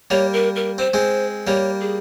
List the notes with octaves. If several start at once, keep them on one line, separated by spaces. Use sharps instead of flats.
G3 A#3 C#5
A#4
A#4
C4 C5
G#3 C4
G3 A#3 C#5
G#4